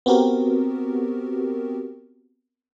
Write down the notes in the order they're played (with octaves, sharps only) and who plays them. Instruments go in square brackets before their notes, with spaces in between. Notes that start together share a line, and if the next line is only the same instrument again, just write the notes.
[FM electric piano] B3 C4 F#4 G4 A#4